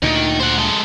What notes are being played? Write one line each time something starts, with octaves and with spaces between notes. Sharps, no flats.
D2 A#2 D#3
C5 F#5
G#3 A4